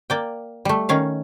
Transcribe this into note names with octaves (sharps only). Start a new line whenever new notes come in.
A#3 D5 G5
G3 A3
D#3 C#4 F5